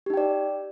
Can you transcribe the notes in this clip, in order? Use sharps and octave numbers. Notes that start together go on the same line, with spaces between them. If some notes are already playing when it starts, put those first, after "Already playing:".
D#4 G4 D5 G5